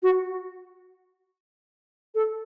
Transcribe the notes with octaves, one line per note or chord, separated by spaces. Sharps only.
F#4
A4